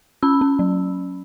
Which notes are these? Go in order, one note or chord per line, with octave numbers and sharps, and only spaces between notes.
C#4 B5 E6
C#4
F#3